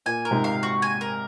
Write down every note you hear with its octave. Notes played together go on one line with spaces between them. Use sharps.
A#2 G#5
A#4
G#2 C3
F5
F#4
G#5
A#4